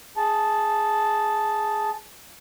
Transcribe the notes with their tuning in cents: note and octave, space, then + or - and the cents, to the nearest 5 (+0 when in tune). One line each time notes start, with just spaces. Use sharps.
G#4 +0 A5 -5